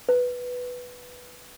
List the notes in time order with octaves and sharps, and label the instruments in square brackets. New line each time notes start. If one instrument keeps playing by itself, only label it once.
[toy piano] B4